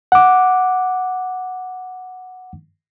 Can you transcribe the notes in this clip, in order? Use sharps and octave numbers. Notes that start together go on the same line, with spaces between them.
F#5 D6